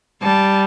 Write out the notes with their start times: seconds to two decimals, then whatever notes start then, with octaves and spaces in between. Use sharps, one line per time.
0.22 G3 A5